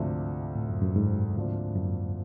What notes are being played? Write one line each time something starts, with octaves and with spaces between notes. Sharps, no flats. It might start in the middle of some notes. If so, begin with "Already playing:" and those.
Already playing: D2 G#2 C3 F3 A3 D4
A2
F#2
F#2
G#2
D2 C3 F3 A#3 D4
F#2